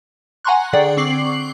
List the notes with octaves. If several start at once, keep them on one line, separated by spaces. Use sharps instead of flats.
F#5 G#5 A#5 C6 C#6 F#6
D3 G#4 D5 F#5 G5
C4 C#6 D6 C7 F#7